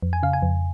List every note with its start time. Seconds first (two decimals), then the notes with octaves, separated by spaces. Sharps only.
0.03 F2
0.13 G#5
0.23 C#3 F5
0.33 G#5
0.42 F2